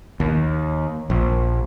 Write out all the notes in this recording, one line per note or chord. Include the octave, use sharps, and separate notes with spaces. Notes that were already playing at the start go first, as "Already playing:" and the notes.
D#2
A#1